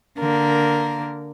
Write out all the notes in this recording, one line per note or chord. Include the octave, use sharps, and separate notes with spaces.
D3 A#3 A#4